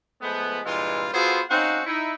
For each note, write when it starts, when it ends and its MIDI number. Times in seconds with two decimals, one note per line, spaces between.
0.21 0.59 53
0.21 0.59 56
0.21 0.59 57
0.21 0.59 59
0.64 1.07 43
0.64 1.07 46
0.64 1.07 52
0.64 1.07 56
0.64 1.07 60
0.64 1.07 65
1.13 1.41 59
1.13 1.41 65
1.13 1.41 66
1.13 1.41 68
1.13 1.41 69
1.13 1.41 72
1.50 1.80 60
1.50 1.80 61
1.50 1.80 63
1.50 1.80 66
1.50 1.80 77
1.50 1.80 78
1.85 2.12 63
1.85 2.12 64